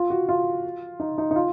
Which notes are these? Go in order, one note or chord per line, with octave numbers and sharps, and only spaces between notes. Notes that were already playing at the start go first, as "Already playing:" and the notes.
Already playing: F4
F#4
F4
D#4
D#4
D#4
F4